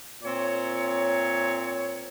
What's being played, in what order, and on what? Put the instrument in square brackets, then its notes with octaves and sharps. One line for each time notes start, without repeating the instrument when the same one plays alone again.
[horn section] A#2 C4 C#5